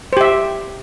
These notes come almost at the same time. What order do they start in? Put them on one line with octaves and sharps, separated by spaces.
C5 G4 E5